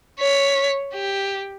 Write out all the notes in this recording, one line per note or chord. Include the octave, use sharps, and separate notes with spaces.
C#5 B6
G4